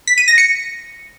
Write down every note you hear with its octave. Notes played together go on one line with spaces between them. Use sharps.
B6
D#7
A#6
C#7